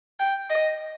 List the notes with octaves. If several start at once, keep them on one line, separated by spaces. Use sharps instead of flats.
G5
D#5